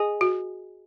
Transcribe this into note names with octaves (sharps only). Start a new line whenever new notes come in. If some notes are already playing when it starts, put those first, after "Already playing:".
Already playing: G#4 D#5 G#5 D#6
F#4